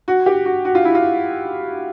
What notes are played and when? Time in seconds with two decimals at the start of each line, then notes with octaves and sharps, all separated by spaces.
0.08 F#4
0.26 G4
0.46 F#4
0.65 F#4
0.75 F4
0.85 E4
0.95 F4